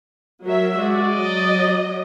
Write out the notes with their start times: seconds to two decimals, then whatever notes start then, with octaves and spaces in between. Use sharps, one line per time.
0.44 F#3 A#4 E5
0.78 G#3 F#4 D5
1.11 F#3 D#5